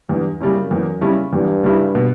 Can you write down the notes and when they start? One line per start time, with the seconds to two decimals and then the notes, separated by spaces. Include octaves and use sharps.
0.09 E2 G2
0.40 F#2 C#3 G3 C#4 E4
0.71 E2
1.01 C#3 G3 C#4 E4
1.33 E2 G2
1.64 C#3 G3 C#4 E4
1.95 B2